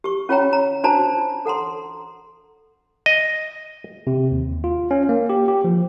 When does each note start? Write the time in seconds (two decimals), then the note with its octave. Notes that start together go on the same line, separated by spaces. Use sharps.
0.04 G4 C#6
0.29 C#4 F4 C#5 F5 G5 A#5
0.53 A#5
0.84 D4 F#4 C5 A5 A#5
1.18 F4
1.46 A4 F#5 A#5 C6
3.06 D#5
4.07 C3
4.32 D#2
4.64 F4
4.91 C#4
5.09 A#3
5.29 G4
5.48 G4
5.64 F3